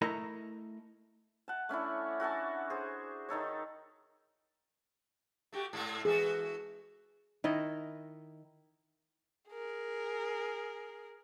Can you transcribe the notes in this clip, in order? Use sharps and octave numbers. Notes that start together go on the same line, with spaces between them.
A3 E4 A#4 D#5 A#5
F#5 A5
A3 C#4 D4 E4
F#4 A4 G#5 A5
G#4 C5
D#3 D#4 A4 C#5
A3 F#4 G4
G#2 A3 A4
E3 F#4 G#4 A4
D#3 E4 D#5
G#4 A#4